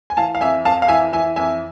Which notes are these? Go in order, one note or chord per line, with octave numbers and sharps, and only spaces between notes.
G#5
E3 F5 A5
F5
F2 E5 G#5
F2 F5 A5
F5
E3 E5 G#5
E3 E5 G#5
F2 E5 G#5